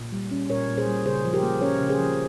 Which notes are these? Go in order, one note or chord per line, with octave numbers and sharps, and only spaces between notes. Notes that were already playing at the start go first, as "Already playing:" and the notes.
Already playing: A#2
G3
C#4
A#2 A#4 C#5
A#2
G#4 C5
G3
C#3 G#4 C5
F3
G4 A#4
A#3
C#4 A#4 C#5
C#3
G#4 C5
F3